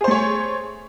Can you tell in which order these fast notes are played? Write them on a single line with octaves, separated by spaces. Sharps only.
G#4 C5 A3 C#5